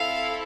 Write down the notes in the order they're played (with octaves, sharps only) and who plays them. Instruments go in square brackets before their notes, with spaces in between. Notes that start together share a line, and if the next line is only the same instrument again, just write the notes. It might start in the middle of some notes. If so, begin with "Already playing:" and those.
Already playing: [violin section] C4 E4 A4 F5